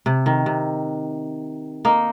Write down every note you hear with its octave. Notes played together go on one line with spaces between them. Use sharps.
C3
D#3
C3
A#3 D#4